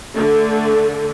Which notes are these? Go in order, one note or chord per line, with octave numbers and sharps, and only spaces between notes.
D3 A3